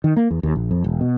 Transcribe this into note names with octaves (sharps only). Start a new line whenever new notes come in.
D#3
A#3
E2
D#2
A#1
F2
E1
B2